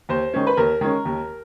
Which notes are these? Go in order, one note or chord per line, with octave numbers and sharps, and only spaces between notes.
D#2 C5
D#3 G#3 C#4
B4
D#2 A#4
D#3 G#3 C#4
D#2